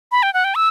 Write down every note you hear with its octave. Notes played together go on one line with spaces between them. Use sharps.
B5
G5
F#5
G5
E6